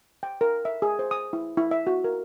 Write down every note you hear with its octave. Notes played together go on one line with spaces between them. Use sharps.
G5
A#4
E5
G#4
C5
D#6
E4
E4
E5
F#4
A#4